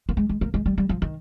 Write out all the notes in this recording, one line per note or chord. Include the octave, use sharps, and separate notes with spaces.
A#3
G#3
G#3
A#3
G#3
G3
G3
F3
D#3